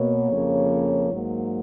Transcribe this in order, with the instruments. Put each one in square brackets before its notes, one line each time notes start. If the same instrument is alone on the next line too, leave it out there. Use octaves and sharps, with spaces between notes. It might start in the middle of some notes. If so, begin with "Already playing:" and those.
Already playing: [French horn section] B2 A#3 C#5
F2 C#3 F3 A#3
G#2 F#3 A#3